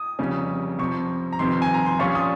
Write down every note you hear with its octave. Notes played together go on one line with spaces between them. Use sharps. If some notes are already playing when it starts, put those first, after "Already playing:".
Already playing: D#6
F1 F2 C#3 G3 C#4
F2 C3 F3 C#6
A#5
G1 F2 C3 D#3 C6
G#5
A#5
C6
A#1 A#2 G3 C#4 F4 C#6
D#6